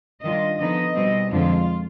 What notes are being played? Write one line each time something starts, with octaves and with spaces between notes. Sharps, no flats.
D#3 G3 D4 F4 D#5
D3 F3 B3 D#4 D#5
B2 G3 C4
F2 D3 F3 G#3 F4